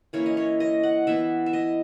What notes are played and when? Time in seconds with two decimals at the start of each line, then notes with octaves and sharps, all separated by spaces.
0.13 E3 A#3 C#4 E4 C#5
0.26 D#5
0.37 C#5
0.60 D#5
0.83 F#5
1.07 E3 B3 E4 E5
1.46 E5
1.53 D#5